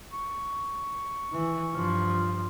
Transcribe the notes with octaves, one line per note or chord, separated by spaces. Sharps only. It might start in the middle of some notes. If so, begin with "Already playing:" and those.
C#6
E3
G2 F3